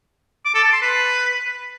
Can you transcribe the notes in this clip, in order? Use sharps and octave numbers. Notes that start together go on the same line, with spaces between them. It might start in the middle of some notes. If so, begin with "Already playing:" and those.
D6
A4
A5
C6
B4